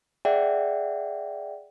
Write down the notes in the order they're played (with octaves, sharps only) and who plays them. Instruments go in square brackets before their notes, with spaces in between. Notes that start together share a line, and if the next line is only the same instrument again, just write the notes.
[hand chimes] G#4 D5 E5 F#5 G5